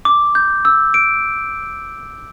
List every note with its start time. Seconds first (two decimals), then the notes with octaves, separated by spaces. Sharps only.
0.05 D6
0.35 G6
0.65 E6
0.94 D7